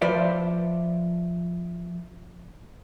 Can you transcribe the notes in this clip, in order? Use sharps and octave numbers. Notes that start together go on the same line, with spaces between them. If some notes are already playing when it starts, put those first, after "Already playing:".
F3 F4 B4 C5 D5 E5